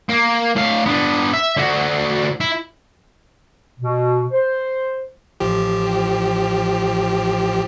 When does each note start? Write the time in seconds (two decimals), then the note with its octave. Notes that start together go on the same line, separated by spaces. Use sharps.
0.09 A#3
0.56 A2 F5
0.86 B3 D4
1.33 E5
1.57 D3 F#4
2.40 E4
3.80 B2
4.31 C5
5.40 A1 F3 G4